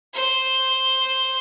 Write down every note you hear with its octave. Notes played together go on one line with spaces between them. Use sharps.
C5